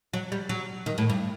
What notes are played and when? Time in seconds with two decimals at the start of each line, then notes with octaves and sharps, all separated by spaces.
0.13 F#3
0.32 G3
0.49 F#3
0.86 D#3
0.98 A2
1.10 G2